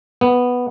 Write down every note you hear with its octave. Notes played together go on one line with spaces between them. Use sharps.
B3